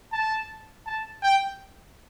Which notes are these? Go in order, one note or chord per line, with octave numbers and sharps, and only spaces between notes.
A5
A5
G5